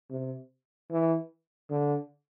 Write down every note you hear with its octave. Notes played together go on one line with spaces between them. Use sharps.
C3
E3
D3